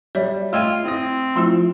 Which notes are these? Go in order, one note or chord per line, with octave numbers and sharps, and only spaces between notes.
G3 C#5 D5 E5
A3 F4 D#5 G5 E6 G#6 D#7
C4 E4 D#6 A#6
F3 A3 E4 C6 E6